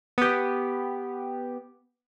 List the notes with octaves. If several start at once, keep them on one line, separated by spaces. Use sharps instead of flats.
B3 G4